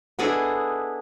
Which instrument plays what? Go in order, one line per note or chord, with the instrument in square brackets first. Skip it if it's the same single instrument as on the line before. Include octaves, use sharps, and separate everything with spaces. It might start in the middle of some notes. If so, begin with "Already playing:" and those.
[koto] B3 D4 E4 G#4 A4 D#5